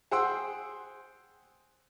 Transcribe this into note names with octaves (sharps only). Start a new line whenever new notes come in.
G#4 C5 F#5 G5 C6 E6